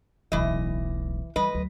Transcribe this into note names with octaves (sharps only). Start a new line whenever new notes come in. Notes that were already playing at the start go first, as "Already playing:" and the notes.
D1 B1 E3 D#5
E3 G3 B4 D#5
D2 F#3